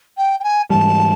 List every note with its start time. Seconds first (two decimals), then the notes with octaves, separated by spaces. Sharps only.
0.17 G5
0.40 G5
0.44 G#5
0.70 G#2 E3 G3 A5